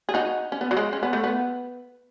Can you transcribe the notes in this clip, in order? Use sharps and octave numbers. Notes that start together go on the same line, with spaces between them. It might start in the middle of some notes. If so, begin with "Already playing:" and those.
G#4
D#4 F#4
C#4
B3
F#3
G#3
C#4
B3
A3
B3